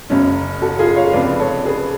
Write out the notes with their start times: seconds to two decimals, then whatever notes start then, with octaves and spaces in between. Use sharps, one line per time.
0.10 F#1 F#2 C#3 C#4
0.62 F#4 A4
0.79 F4 G#4
0.96 C#5 F5
1.13 F1 F2 C#3 B4 D5
1.39 A4 C#5
1.65 G#4 B4